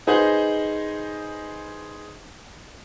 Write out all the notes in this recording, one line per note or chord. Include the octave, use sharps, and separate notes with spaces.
D#4 G#4 B4 C5 D#5